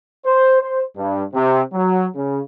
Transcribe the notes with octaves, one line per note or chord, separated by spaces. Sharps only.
C5
C5
G2
C3
F#3
C#3